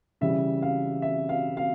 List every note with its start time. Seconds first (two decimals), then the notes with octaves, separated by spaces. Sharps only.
0.21 C#3 E3 G3 E5
0.62 F5
1.02 E5
1.29 F5
1.57 F5